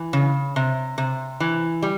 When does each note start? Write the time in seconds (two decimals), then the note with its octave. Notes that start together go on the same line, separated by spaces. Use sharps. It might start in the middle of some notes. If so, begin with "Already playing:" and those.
Already playing: E3
0.13 C#3
0.56 C3
0.98 C3
1.40 E3
1.83 G3